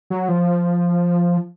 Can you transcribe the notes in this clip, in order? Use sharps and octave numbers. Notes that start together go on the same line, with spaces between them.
F#3
F3